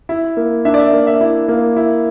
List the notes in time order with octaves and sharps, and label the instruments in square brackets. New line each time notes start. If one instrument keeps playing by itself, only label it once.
[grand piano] E4
A#3
D4 E5
D5
E5
A#3
E5
E4
A#3
E4